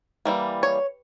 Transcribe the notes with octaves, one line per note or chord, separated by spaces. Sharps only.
E3 G3 A#3
C#5